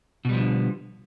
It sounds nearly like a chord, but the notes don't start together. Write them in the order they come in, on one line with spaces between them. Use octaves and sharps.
B2 G3 F3 D3